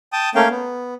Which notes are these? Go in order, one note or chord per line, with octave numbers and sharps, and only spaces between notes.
G5 A5 D#6
A3 A#3 C#4 F5 G5
B3